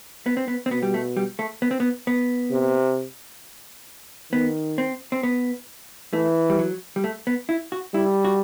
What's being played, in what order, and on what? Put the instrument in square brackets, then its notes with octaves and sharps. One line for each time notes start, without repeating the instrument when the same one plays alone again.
[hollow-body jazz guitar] B3
C4
B3
C4
[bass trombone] B2 [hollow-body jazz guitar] B3
[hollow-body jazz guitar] G3
A3
G3
A3
B3
C4
B3
B3
[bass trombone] C3
[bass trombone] D#3 [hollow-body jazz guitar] B3
[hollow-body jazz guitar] C4
C4
B3
[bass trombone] E3 [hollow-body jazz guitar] A3
[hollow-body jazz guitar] G3
F#3
G3
A3
B3
E4
F#4
[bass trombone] G3 [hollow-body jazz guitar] E4
[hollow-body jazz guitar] F#4